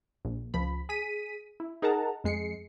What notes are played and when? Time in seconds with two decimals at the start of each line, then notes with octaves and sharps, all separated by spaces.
0.25 A#1
0.54 C#2 F3 B5
0.89 G#4 B6 D#7
1.60 E4
1.82 D#4 G#4 A#4 F#5 A5 A#5
2.24 F2 G#3 C7 C#7